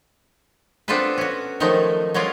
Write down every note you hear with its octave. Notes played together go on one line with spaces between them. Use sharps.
B3 C4 D4 F4 A4 B4
C#4 F#4
D#3 F3 F#3 G#3 A3 D#4
F#3 G#3 C#4 F4 D5